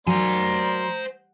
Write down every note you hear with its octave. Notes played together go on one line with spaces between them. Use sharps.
F#3 A#3 C5 D5 G#5 A#5 C6